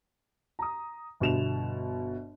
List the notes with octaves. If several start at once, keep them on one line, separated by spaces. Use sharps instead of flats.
A#5 D#6
G1 B2 E7 F7